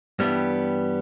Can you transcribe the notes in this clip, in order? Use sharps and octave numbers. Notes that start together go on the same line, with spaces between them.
G2 E3 G3 B3